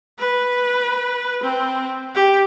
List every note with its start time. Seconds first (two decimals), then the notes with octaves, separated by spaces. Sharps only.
0.19 B4
1.43 C4
2.15 G4